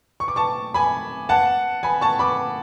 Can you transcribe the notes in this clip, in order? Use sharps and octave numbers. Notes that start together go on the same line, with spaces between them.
C#6
D6
A5 C#6
G#5 B5
F#5 A5
G#5 B5
A5 C#6
B5 D6